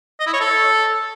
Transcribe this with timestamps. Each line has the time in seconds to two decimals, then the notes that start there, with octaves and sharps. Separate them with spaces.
0.20 D#5
0.27 E4
0.34 C#5
0.40 A4